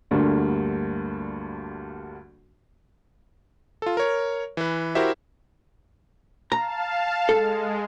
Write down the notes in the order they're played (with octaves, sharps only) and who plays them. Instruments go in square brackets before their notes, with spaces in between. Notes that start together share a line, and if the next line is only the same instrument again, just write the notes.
[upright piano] D2 G2 D3 G3 A3 A#3
[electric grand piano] F4 A4
A#4 C#5
E3 B4
E4 F#4 G4 A#4 C5 E5
[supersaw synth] F5 A5 [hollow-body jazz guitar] A#5
[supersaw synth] G#3 [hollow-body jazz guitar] A4